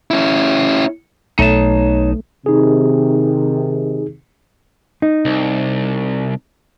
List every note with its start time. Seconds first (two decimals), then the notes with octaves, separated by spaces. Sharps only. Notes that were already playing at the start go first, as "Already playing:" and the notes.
0.11 C#4 E4
1.39 B1 A3 D#4 C#5 A5
2.46 C3 D#3 D#4 G#4
5.02 D#4
5.25 C2